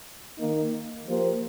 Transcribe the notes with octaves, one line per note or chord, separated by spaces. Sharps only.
D#3 A#3 D#4
F3 A#3 G4 C5